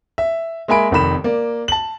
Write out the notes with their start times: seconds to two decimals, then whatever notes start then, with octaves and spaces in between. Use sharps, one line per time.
0.18 E5
0.68 G#3 A#3 E5 G#5 B5 D7
0.91 F1 F2 D#3 B5 E7
1.24 A#3 D5
1.68 A5 F#7